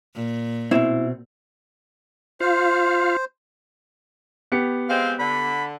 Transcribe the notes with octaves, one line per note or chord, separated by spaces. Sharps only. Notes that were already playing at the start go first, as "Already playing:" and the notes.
A#2
B2 C4 E4
F4 C5 F5
B3 G4 C#7
G#3 C4 F5
D3 B5